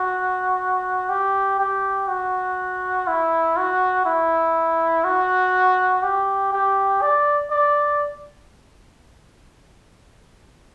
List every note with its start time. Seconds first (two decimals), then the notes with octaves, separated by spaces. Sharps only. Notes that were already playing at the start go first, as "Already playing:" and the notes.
Already playing: F#4
1.09 G4
1.60 G4
2.08 F#4
3.08 E4
3.57 F#4
4.06 E4
5.05 F#4
6.03 G4
6.53 G4
7.02 D5
7.51 D5